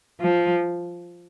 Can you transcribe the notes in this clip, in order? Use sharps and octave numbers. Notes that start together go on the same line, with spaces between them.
F3